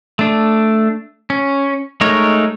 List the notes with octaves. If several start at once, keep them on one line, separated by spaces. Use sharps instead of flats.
A3 D4
C#4
G#3 A3 D#4 A#4 C#5